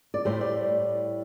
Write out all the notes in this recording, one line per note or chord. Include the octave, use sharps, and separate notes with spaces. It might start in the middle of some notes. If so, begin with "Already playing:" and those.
D5
A2 G3 C5
D5